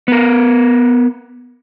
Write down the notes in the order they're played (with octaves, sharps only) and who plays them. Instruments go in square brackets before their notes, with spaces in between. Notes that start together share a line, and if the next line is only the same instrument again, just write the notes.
[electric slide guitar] B3 A#4